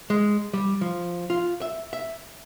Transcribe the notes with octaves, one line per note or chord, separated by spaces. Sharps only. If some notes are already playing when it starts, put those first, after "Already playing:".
G#3
G3
F3
F4
E5
E5